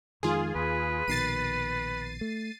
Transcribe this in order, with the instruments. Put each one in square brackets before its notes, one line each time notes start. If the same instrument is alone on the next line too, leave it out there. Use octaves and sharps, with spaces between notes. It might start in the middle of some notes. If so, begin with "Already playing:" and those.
[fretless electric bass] F2 D#3 G#3 [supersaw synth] F4 G#4
[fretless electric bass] D#2 [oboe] B4
[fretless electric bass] A#1 B2 D#3 [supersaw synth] A6 C7 D#7
[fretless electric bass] A3